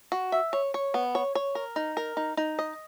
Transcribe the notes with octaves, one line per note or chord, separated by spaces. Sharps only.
F#4
E5
C#5
C#5
B3
C#5
C#5
A#4
D#4
A#4
D#4
D#4
D#5